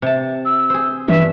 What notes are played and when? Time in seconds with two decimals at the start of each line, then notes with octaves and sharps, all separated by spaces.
0.02 C3 A5
0.45 E6
0.70 G#4 C5
1.08 G2 E3 E5